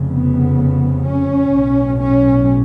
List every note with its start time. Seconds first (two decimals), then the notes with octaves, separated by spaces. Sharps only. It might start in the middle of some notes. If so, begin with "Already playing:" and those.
Already playing: F1 F2 C#3
0.09 B3
1.05 C#4
1.52 B1 A2
2.00 C#4